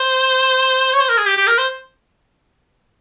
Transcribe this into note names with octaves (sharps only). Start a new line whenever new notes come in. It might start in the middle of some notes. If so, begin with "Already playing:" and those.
Already playing: C5
C#5
C5
A#4
G#4
G4
G4
A#4
C5